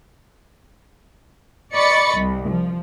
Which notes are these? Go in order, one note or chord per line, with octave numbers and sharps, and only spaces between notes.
D5 D#5 B5 C#6 A6 C#7
C2
F3